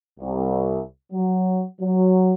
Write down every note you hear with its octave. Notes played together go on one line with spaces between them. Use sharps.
C2
F#3
F#3